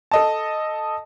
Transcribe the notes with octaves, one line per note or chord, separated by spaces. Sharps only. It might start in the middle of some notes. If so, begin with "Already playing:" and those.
A4 D#5 A5